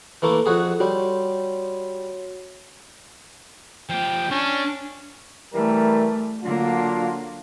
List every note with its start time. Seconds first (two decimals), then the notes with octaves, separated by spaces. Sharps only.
0.22 E3 A3 A#3
0.46 F2 F#4 G#4
0.80 G3 F#4 C#5
3.90 F3 G4 G5
4.31 C#4 D4
5.54 E3 G3 A3 A#4
6.44 D3 F#3 A#3 D4 F4